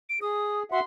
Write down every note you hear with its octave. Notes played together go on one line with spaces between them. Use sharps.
D7
G#4 D#6
F#4 E5 F#5 C6